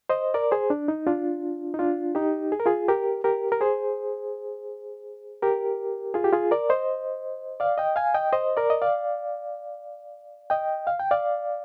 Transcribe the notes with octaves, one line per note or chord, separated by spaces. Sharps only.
C5 D#5
A#4 D5
G#4 C5
D4
D#4
D4 F4
D#4
D4 F4
D#4 G4
G#4
A#4
F4 G#4
G4 A#4
G4 A#4
A#4
G#4 C5
G4 A#4
F4 G#4
G4
F4 G#4
A#4 D5
C5 D#5
D5 F5
D#5 G5
F5 G#5
D#5 G5
C5 D#5
A#4 D5
D#5
D5 F5
D#5 G5
F5
G5
D5 F5